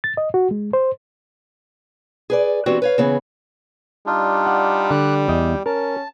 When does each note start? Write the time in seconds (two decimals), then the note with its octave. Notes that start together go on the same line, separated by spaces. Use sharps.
0.04 A6
0.17 D#5
0.34 F#4
0.51 G#3
0.73 C5
2.30 G#4 B4 D5
2.66 E3 B3 C4 D4 F#4 G4
2.82 B4 C#5 F5
2.98 C#3 E3 B3 G#4
4.06 G3 D4 D#4 F4
4.46 F#5
4.91 D3 D6 F#6
5.28 E2 D#5 G5
5.66 C#4 A#4 A5